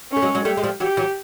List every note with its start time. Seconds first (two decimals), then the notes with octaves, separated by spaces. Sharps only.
0.12 A3 C#4
0.22 F#3 G#3
0.35 F#3 G#3
0.45 G3 A3 G4
0.57 G#3
0.63 F3 G3
0.80 E3 F#3 G4
0.97 E3 F#3